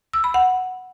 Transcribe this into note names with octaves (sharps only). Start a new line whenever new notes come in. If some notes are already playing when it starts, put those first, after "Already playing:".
E6
B5
F#5